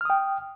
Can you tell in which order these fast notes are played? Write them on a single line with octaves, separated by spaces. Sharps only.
F6 D#6 G5